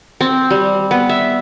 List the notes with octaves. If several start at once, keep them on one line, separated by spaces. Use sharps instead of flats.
C4
G3
B3
E5